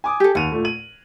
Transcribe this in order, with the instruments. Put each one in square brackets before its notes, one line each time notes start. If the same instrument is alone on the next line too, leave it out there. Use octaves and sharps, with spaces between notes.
[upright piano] G#5 D6 D#6
[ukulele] G4 A4
[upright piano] D#2 D#7 F7 [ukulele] F#5
[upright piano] A#2 A3
D#7 F#7